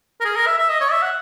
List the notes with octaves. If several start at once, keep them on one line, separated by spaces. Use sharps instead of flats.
A#4
G#4
A#4
E5
E5
D#5
C#5
E5
F#5